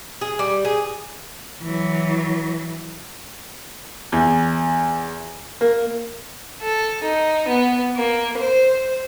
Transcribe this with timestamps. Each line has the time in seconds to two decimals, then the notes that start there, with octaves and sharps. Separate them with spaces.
0.21 G#4
0.39 G3
0.65 G#4
1.63 E3 F#3
4.12 E2
5.61 A#3
6.61 A4
7.03 D#4
7.48 B3
7.95 A#3
8.37 C5